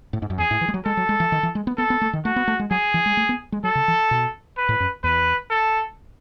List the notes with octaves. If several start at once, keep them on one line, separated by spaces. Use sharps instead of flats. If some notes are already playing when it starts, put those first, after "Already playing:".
A2
G#2
F#2
E2 G#4
A2
E3
G#3
F#3
G#3 A4
F#3
G#3
E3
D#3
E3
G#3
B3
B3 A4
B3
A3
D#3
A3 F#4
B3
A3
G#3
F#3 G#4
E3
G#3
A3
B3
G#3
F#3 A4
C#3
E3
B2
B4
A2
F#2
E2 B4
A4